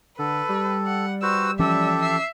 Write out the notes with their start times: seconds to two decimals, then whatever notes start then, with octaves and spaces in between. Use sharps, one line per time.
0.19 D3 A4 B4
0.49 G3
0.86 F#5
1.22 F#4 B4 C5 E6
1.59 E3 F3 C#4 G4 A4 E5
2.02 E5 C7